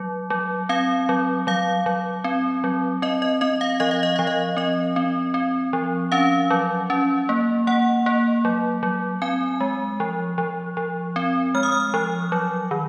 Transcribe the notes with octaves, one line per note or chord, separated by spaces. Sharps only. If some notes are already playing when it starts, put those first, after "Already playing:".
Already playing: F#3
F#3
C4 F5
F#3
F#3 F5
F#3
C4
F#3
C4 D#5
D#5
C4 D#5
F5
F3 D#5
F5
D#5
F3 F5
D#5
C4 D#5
C4
C4
F3
C#4 F5
F#3
C#4
A#3
A#3 F#5
A#3
F#3
F#3
C4 G#5
G#3
F3
F3
F3
C4
G#3 F6
D#6
F6
F3
F#3
D#3